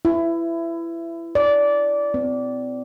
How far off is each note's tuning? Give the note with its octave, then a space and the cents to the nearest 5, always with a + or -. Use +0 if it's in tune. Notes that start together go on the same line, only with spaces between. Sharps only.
E4 +20
D5 -15
C4 -35